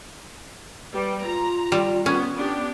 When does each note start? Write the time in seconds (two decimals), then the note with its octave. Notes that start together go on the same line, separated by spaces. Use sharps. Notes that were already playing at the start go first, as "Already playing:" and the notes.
0.93 G3 B4
1.23 F4 A#5
1.72 G3
2.06 B3 C#4
2.35 B3 D4 G4